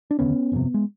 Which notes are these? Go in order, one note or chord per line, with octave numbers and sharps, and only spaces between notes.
D4
F1 D#2 D3 B3 C#4
G1 F2 C3
G#3